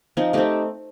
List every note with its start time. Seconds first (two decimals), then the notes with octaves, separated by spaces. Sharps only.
0.17 F3 C4 D#4
0.33 A3 C4 D#4 G4